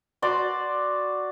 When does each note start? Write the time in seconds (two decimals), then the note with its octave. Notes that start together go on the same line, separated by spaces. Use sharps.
0.22 F#4 D5 C6